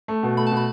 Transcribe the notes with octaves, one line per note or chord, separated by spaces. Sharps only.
A3
B2
A3 B5
A5
B2
B5